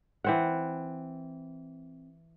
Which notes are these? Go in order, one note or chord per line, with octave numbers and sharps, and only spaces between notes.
E3 C4 F#5